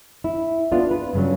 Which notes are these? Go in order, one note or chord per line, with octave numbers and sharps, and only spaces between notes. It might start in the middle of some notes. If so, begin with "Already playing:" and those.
E4
B3 D4 F4
B4
G2 C#3 F#3